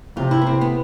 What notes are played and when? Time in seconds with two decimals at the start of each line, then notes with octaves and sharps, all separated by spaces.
0.16 C3 F4
0.31 E4
0.42 B3
0.47 C4
0.61 B3